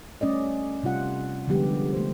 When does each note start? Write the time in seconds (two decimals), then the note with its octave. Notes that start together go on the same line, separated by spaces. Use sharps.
0.21 G3 A3 C#4 D5 D#5
0.83 C3 G3 F4 F#5
1.48 D3 F3 G3 G#3 B3 G4
1.93 A3 C5